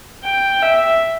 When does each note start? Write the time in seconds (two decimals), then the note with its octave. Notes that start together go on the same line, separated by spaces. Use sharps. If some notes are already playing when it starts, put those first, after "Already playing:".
0.25 G5
0.63 E5